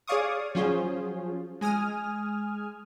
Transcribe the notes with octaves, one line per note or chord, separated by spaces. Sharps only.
G#4 C#5 D5 F5 C#6 D#6
F3 F#3 C#4 F4 G#4 C5
G#3 G#5 D#6 F6